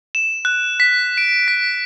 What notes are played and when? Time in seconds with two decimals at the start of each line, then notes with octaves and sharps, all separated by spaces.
0.15 E7
0.45 F#6
0.80 B6
1.17 D7
1.48 B6